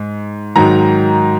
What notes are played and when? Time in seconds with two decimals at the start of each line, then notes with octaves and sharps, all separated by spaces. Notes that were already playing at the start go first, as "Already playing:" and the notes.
Already playing: G#2
0.56 G#2 D#3 F#3 A#5